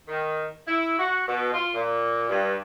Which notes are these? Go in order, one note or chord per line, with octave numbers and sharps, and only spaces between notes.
D#3
E4
F#4
B2
F4
A#2
G2